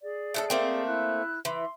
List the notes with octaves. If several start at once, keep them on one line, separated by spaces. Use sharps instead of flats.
G#4 D5
A2 D4 A4
A3 A#3 C4
E4 F#6
E3 C6